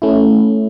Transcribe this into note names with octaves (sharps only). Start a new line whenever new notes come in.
A3 C#4 E4